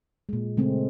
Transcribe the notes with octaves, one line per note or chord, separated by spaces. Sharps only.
A#2 G#3
C#3 G#3 A3 C4 C#4